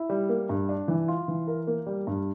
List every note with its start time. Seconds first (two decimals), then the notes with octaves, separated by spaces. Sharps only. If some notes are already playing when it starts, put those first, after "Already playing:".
Already playing: E4
0.10 G3
0.29 A#3
0.49 G2
0.69 D4
0.88 E3
1.08 F4
1.28 E3
1.47 A#4
1.67 A#3
1.87 G3
2.07 G2